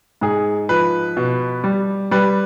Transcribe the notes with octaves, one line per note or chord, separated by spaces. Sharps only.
G#2 G#4
F3 B4
B2
G3
G3 B4